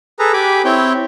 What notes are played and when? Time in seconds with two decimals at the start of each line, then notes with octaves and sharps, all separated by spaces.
0.19 G#4 A4 B4 A#5
0.33 G4 G#5 B5 D6
0.65 C4 E4 C#5 G5